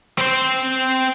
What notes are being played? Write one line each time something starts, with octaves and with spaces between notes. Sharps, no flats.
C4 C5